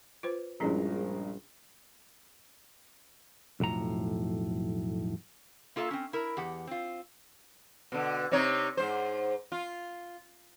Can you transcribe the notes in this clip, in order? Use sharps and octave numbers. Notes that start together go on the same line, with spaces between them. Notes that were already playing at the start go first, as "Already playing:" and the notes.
F4 B4 C5
A#1 G2 F3 G#3 C#4 E4 A#5
B1 F2 A2 A#5
A#3 F4 A4 E5
C4 C#4
E4 A#4
E2 G4 F#5
C4 F4
B2 D3
C3 D#4 C#5
G#2 C5
F4